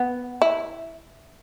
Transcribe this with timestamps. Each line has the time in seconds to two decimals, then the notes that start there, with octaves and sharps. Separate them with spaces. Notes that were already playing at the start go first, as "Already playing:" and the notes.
Already playing: B3
0.42 E4